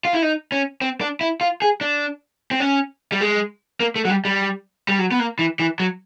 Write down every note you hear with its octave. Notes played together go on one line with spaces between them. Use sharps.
F4
E4
D#4
C#4
C4
D4
E4
F4
G#4
D4
C4
C#4
G3
G#3
A#3
A3
F#3
G3
G3
G3
F#3
B3
A#3
E3
E3
F#3